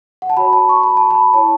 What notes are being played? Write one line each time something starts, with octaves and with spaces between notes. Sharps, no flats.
F#5
A5
F#4 C#5 B5
A5
C#6
B5
A5
B5
E4 C#5 A5